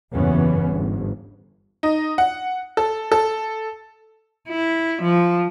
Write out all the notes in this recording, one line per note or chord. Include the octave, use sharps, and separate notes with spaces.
F#1 E2 G2 E3 B3 C#4
G1 G#2
D#4
F#5
A4
A4
E4
F3